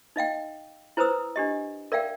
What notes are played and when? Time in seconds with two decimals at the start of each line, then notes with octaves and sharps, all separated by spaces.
0.16 D#4 D#5 F5 G5
0.97 E4 B4 C5 A#5 D#6 E6
1.36 D4 G4 D#5
1.92 A#4 D5 E5 F5 G5